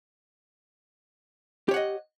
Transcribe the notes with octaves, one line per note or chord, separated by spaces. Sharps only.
G4 C#5 D#5 F#5